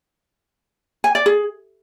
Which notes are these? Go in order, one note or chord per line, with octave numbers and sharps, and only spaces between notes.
G#5
D5
G#4